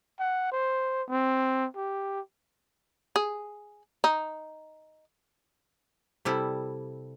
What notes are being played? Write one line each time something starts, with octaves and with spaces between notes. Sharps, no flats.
F#5
C5
C4
G4
G#4
D#4
C3 G3 E4 A4